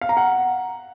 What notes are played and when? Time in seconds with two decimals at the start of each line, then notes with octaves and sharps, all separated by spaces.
0.01 F5
0.09 A#5
0.17 F#5